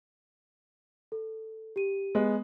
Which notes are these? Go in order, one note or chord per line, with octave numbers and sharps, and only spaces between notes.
A4
G4 D#7
G#3 B3